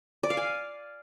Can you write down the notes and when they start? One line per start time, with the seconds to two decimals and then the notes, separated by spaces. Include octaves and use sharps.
0.23 D5
0.30 F5
0.37 G#5